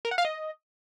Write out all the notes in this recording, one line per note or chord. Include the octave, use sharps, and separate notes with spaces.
A#4
F#5
F5
D#5